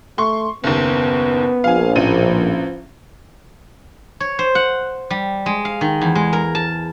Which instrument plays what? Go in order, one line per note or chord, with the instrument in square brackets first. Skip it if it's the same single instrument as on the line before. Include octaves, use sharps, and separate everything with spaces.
[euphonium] A3 [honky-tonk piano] C6 C#6
[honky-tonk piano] F#1 D#2 [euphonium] B3
[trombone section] A#1 [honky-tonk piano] F5 G#5
[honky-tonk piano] A1 D#7 [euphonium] F3
[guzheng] C#5
C5
F#5
G3
G#3
F5
D#3
E2
G#3
A#4
A5